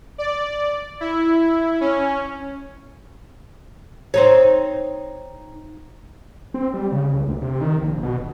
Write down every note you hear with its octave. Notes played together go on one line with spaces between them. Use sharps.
D5
E4
C#4
C4 D#4 C#5
C4
G3
C#3
C#2
D2
C3
D#3
A#1
B2
D#1